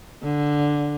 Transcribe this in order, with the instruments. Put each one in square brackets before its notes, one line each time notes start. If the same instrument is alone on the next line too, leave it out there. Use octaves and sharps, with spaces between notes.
[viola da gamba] D3